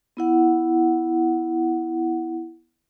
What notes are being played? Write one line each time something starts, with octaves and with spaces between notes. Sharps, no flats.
B3 E4 F#5